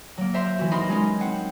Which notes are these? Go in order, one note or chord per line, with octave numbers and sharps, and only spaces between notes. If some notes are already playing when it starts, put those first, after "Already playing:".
F#3 A#3
C5 E5 A#5 C6
E3 F#4
D#4 F#4 A#4 B5 C6
G#3 C#4 D#4
C4 F#5